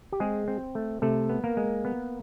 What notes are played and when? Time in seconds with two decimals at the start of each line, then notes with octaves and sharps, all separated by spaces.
0.12 G4
0.20 G#3 C4 G#4
0.48 C4
0.75 A3
1.02 C3 A3 A4
1.29 B3
1.44 A#3 A#4
1.57 G#3
1.85 B3